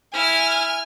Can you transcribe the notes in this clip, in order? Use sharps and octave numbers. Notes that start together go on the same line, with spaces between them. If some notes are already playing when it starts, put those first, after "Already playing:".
E4 G#5 F6